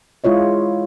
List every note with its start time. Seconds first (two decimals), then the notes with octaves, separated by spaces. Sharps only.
0.24 G#3 E4 F4 C#5 D#5